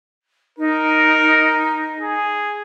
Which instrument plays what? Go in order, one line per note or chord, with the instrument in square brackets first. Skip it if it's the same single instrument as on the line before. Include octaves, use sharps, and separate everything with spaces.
[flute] D#4 [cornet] A#4
[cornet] G#4